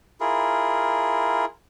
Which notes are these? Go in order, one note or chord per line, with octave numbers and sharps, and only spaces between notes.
E4 F4 G#4 A#4